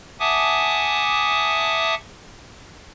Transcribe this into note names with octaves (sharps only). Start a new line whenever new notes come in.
E5 F#5 G#5 A5 D6 D#6